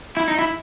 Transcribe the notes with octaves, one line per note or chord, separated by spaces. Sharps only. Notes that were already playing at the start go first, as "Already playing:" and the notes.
E4
D#4
E4